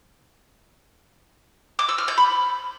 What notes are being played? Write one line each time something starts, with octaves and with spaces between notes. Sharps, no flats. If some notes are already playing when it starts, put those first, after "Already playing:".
D6
E6
F6
G6
B5